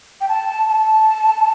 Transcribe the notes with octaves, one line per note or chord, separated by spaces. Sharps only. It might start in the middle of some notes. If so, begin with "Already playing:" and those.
G5
A5
A5